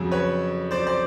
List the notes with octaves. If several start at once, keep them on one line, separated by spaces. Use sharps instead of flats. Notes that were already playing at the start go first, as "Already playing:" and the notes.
Already playing: F2 C#3 F#3
B4 C#5
C5 D5
C5 D5